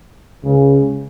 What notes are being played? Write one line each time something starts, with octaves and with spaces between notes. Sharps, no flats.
C#2 C#3